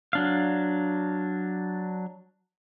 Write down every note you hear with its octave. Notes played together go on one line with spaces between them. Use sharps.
F#3 D4 F5